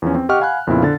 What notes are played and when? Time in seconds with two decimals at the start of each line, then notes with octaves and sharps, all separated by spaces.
0.02 E2 F3 C#4
0.15 C4
0.29 G4 D#5 F#5 G5 C#6 F6
0.40 F5 F#5 G#5 B5 F6 F#6
0.67 F2 A#2 C#3 B3 E4 F4
0.83 D3 A6